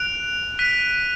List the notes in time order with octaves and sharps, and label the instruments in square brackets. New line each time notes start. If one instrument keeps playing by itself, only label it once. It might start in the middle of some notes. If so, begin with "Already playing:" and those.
Already playing: [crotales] F#6 D7 F7
F#6 B6 D#7